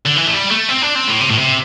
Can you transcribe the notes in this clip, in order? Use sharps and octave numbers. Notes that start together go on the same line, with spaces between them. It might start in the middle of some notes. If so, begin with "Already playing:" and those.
D3
E3
A3
G3
A3
C4
D4
C4
A2
C3
A2
C3